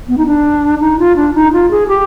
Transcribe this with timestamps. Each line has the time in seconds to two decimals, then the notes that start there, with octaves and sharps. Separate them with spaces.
0.08 B3
0.18 D#4
0.26 D4
0.80 D#4
0.99 F4
1.16 D4
1.35 D#4
1.53 F4
1.71 G#4
1.88 G4